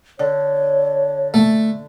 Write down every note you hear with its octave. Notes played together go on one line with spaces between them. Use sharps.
D3 C#5
A3